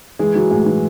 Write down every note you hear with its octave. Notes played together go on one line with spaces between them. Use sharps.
E3 G#3 G#4
E3 F#3 F#4
A2 G#3 G#4
E3